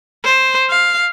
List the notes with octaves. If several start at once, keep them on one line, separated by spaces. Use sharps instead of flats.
C5
F5